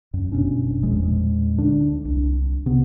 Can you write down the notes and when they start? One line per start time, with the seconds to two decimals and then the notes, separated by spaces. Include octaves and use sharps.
0.14 F#2
0.32 G1 B2 C#4 D4
0.83 E2 A#2 F3 G#3
1.58 D2 D3 D4
2.05 C2
2.66 C3 B3